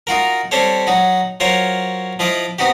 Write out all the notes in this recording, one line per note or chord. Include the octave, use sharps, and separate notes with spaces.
D#4 F4 F#4 A#4
G3 C4 G4 A4 C5 C#5
F#3 D#4 F#4
F#3 F4 A#4 C5 C#5
F3 E4 F4 D#5 D6
B3 C4 D#4 F#4 G4